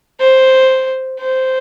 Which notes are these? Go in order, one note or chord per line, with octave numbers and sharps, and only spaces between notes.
C5
C5